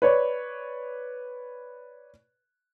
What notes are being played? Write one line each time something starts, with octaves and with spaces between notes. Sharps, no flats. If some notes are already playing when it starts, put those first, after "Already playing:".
B4 C#5 D5